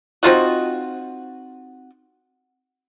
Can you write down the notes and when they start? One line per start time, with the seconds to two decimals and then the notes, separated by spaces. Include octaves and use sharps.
0.23 C4 D#4 F4 F#4